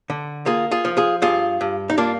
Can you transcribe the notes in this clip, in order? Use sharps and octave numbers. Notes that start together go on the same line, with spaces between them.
D3
A#3 F4 G#4
F4 G#4
F3
F4 G#4
G2 F4 G#4
G2
D#4
A#3 D4 F4